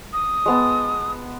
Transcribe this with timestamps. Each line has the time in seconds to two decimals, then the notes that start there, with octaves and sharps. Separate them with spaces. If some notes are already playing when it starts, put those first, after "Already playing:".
0.13 D#6
0.46 G#3 B3 A5